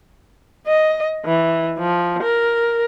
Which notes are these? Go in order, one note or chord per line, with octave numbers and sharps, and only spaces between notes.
D#5
E3
F3
A#4